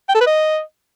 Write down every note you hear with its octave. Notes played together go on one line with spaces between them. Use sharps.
G5
A4
B4
D#5